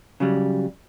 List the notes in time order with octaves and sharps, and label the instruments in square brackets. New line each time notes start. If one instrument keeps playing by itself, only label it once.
[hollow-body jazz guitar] C#3 F#3 G3